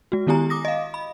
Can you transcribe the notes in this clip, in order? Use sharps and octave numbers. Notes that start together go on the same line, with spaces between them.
G#3 F#4
D#3 B3 E4 G4 G#5 A#5
D6 D#6 A#6
D#5 F5
B5